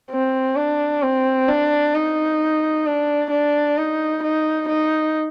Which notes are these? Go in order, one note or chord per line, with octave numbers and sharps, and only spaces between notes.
C4
D4
C4
D4
D#4
D4
D4
D#4
D#4
D#4